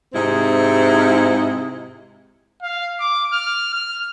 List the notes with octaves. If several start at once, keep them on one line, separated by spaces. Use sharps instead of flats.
G#2 C3 C4 E4 D#5
F5
D6
F6
F6